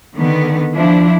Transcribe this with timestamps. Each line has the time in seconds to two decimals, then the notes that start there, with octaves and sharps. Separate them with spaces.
0.16 D3 D#3 B3
0.75 F3 D4 E4